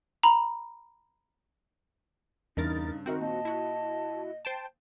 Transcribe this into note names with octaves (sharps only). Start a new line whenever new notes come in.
A#5 B5
E2 G2 C#3 D#4 A#4 A6
D#3 C4 D#4 F#4 A#4
A#2 D#5 A5
E4 F#4
C5 G5 A5